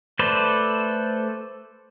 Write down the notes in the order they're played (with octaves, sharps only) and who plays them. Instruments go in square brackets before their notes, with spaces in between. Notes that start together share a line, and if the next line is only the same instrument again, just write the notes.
[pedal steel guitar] A3 A4 B4 C5 D5